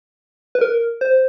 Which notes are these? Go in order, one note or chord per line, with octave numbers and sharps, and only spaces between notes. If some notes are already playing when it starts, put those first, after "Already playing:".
B4
A#4
C5